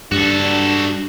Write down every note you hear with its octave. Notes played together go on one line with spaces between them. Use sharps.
G2 D4 F#4 A4